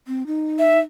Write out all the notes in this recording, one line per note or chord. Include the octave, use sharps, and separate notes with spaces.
C4
D#4
E5